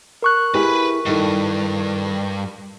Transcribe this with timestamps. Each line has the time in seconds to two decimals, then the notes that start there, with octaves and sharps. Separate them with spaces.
0.22 A#4 C#6 F#6
0.54 E4 G4 G#4 B4 B5
1.06 G2 D#3 E4 A4